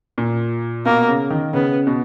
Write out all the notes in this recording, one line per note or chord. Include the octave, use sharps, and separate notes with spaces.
A#2
B2 A#3
C#3
D#3
C#3 B3
B2